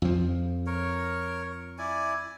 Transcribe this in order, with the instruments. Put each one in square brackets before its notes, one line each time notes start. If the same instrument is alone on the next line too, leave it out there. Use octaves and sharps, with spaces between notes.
[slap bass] F2 F3
[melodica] A#4 C#5
E4 D5 G#5